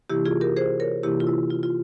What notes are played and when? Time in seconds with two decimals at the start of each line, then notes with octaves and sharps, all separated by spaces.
0.10 C3 E3 A#3 E4 G4
0.25 F4 G#4
0.41 G4 A#4
0.57 G#4 C5
0.80 A#4 C#5
1.03 C3 E3 A#3 E4 G4
1.20 F4
1.27 E4
1.50 F4
1.63 F4